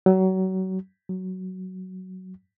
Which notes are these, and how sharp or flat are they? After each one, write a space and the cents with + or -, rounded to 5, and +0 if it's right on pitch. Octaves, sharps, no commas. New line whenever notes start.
F#3 +30
F#3 +10